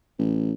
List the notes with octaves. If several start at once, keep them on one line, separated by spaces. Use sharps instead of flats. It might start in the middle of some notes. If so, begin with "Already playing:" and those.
A1